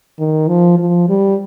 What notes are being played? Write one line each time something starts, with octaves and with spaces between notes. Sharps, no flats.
D#3
F3
F3
G3